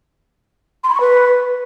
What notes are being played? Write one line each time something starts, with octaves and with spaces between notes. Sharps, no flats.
C6
B5
C#6
B4